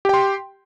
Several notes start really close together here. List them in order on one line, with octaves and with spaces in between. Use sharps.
G4 G5 C6